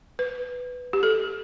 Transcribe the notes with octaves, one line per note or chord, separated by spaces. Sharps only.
B4
G4
A4